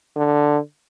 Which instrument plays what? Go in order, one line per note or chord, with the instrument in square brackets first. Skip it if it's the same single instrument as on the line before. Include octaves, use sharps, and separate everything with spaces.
[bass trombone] D3